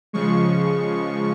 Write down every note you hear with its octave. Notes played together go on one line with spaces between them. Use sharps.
C#3 F3 G#3 C#6